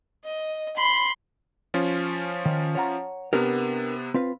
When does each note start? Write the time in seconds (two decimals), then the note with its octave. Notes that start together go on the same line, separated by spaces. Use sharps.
0.24 D#5
0.77 B5 C6
1.74 F3 C#4 F4
2.46 D#3
2.75 C#5 F#5 A#5
3.33 C3 B3 D4 G4 A#4
4.14 C4 F4 B4